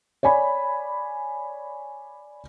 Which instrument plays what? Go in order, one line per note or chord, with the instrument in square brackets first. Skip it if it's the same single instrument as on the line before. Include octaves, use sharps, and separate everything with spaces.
[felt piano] C#5 D5 G#5 B5